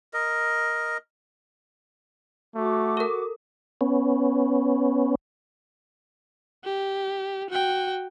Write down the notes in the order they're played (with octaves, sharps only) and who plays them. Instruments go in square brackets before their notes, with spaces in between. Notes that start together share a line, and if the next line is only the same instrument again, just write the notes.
[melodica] A#4 D#5
[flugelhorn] A3 [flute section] F#4 D6
[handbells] A4 A#4
[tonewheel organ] B3 C#4
[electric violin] G4
F#4 G5